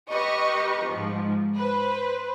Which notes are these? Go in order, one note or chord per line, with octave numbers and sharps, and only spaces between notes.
G4 B4 D#5 C#6
G#2 F3
B4 C5